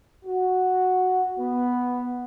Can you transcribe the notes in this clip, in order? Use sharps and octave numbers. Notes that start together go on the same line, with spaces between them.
F#4
B3